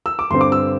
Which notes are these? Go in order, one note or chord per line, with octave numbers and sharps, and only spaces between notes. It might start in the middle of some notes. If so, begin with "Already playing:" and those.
E6
D6
G2 D3 C4 C6
D6
E6